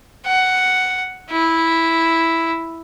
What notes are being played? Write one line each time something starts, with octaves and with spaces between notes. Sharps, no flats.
F#5
E4